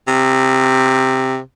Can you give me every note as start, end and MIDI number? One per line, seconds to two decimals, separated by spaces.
0.08 1.39 48